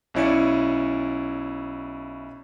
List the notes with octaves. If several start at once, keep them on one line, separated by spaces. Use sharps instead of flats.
B1 C#4 E4 D5 C#7